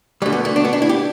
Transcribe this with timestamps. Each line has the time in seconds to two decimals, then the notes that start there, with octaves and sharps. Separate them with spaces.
0.22 D2 D3 G3
0.33 B3
0.45 A3
0.56 D4
0.65 B3
0.73 D4
0.82 E4
0.89 G4